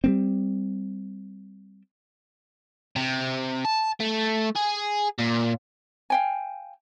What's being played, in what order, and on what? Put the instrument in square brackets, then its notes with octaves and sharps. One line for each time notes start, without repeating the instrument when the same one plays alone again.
[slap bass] G3 A#3 C4
[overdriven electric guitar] C3
A5
A3
G#4
A#2
[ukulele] F5 G5 G#5